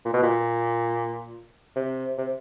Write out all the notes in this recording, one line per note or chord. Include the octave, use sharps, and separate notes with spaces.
A#2
B2
A#2
C3
C3